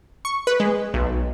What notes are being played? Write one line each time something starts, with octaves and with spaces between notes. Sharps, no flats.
C#6
B4
G#3
B1